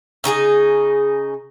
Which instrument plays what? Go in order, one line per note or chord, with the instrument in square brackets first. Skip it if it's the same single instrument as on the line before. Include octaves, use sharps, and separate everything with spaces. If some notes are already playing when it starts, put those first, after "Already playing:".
[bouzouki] C#3 D#4 F#4 G#4